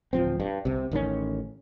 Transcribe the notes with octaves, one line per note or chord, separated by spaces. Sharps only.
D1 F3 C4
G2
C2 C3
A1 D#3 E3 C#4